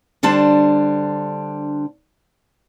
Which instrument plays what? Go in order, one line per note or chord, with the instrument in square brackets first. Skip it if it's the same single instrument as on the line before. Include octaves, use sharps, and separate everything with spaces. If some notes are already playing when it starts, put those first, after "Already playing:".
[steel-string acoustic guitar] D3 G3 D4 C5 A5